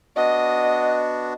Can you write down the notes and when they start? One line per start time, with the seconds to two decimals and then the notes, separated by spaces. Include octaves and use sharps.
0.17 B3 D4 F#4 D#5